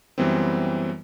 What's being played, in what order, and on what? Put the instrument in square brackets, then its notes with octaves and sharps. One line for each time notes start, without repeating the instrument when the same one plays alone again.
[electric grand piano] F#2 E3 G3 B3 C4